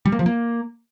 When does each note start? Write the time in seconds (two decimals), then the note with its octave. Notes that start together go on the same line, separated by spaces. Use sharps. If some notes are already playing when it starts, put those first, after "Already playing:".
0.06 G3
0.12 A#3
0.19 F3
0.26 A#3